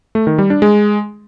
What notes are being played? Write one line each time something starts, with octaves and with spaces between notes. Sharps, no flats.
A3
D#3
G3
D4
G#3